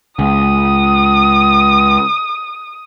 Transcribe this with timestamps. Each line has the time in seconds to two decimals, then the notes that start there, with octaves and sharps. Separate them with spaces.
0.19 C#2 D#6